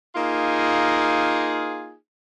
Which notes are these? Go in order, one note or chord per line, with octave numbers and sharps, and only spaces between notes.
A#3 D#4 F4 G#4